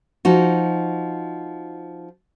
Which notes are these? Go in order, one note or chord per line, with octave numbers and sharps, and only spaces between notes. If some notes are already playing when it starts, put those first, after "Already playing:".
F3 D#4 F#4